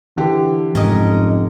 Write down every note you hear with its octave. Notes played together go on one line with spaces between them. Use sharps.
D3 E3 G4
F1 G#2 C#4 A#4 D#5